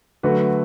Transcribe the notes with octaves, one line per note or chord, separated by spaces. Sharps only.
D3 F#3 A3 F#4 B4